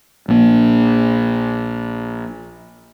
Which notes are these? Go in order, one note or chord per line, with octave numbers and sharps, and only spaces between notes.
A#1 A#3